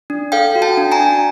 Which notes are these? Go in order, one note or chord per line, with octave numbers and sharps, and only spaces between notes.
D4
A4 F5 G5
F#4
G5 A5
D4
G#5 A#5
D4